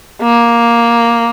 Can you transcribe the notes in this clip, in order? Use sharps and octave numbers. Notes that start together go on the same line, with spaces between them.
A#3